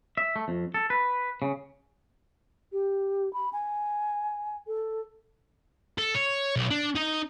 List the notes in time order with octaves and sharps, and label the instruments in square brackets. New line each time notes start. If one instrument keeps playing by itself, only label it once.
[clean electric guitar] E5
A3
F2
A4
B4
C#3
[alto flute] G4
B5
G#5
A4
[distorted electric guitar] A4
C#5
B1
D4
D#4 D#5